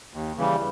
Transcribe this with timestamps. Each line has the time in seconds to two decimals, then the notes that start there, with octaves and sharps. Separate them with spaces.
0.14 D#2
0.37 C#3 E3 G3